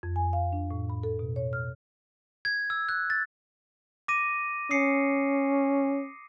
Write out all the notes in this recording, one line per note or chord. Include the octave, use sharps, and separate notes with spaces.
F2
G#5
F5
D4
A2
B5
A4
B2
C#5
F6
G#6
E6
F#6
A6
D6 A#6 D#7
C#4 D#6 C7 C#7